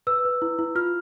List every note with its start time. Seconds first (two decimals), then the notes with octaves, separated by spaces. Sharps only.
0.07 B4 E6
0.25 B4
0.42 E4
0.59 E4
0.75 F4 F6